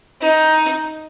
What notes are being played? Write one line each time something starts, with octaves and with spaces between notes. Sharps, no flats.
D#4